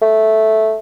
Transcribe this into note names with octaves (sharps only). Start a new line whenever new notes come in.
A3